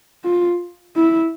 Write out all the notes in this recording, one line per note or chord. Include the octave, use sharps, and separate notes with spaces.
F4
E4